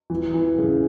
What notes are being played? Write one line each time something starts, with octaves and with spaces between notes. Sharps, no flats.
E3
E3
C#3